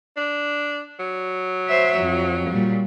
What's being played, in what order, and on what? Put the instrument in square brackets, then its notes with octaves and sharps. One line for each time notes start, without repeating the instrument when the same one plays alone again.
[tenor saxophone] D4
F#3
[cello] C5 E5
F2
A#2 G3